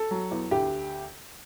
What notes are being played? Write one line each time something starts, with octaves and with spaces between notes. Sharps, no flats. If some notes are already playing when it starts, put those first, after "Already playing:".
Already playing: A4
F#3
E2
D2 G4